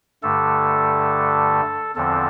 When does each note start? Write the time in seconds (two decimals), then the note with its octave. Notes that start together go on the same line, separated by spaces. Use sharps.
0.23 G2 D3 A3 A4
1.95 E2 D3 F3 C4 A4